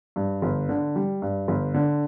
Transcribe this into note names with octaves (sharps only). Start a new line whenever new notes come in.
G2
G1
D3
G3
G2
G1
D3